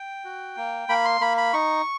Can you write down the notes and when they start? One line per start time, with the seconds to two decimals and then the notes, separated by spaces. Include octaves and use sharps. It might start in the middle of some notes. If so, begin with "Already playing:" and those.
Already playing: G5
0.25 F#4
0.57 A#3
0.89 A#3 B5
1.05 C6
1.21 A#3 B5
1.37 B5
1.53 D#4 C#6